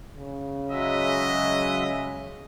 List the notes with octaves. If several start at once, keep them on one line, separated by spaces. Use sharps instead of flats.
C#3
F#3 G#3 D#5 E5